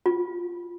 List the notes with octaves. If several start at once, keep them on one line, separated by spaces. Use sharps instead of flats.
F4